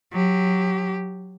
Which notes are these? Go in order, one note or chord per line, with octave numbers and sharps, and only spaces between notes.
F#3 G4